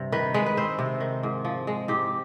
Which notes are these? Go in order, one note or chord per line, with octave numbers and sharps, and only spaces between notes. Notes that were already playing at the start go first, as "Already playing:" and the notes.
Already playing: G2 C3
D#3 B4
G#3 B4
B4
C4 C5
C3
D#3
G#2
F3
G#3
G#2 G4